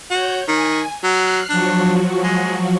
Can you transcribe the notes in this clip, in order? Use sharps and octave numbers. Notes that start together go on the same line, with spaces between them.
F#4 C#5 G6
D#3 G#5
F#3 F6 F#6 C7
F3 F#3 D4 F#4
G#3